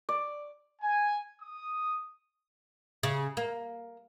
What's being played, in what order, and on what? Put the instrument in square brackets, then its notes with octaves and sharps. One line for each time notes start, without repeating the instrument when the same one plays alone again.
[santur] D5
[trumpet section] G#5
D#6
[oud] C#3
A#3